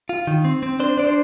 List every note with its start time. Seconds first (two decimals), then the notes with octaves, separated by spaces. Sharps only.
0.09 F4
0.27 D#3
0.45 C4
0.63 C4
0.79 D4 C5
0.97 D4 D5
1.07 C5